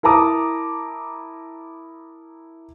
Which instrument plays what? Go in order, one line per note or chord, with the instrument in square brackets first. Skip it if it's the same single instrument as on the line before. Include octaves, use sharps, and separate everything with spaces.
[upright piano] E4 A#4 A5 A#5 D6 D#6